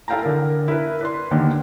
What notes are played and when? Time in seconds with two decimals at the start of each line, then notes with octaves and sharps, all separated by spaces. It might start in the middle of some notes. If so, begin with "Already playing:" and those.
0.08 E4 A4 F5 G5 G#5 A#5
0.23 D3 A#4
0.68 E4 A#4 B4
1.01 B4 D5 C6
1.31 D#2 D3 D#3